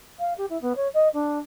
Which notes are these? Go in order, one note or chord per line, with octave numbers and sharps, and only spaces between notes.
F5
G4
E4
B3
C#5
D#5
D4